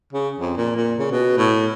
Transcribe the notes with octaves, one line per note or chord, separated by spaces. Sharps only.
C#3
F2
A#2
A#2
C#3
B2
A2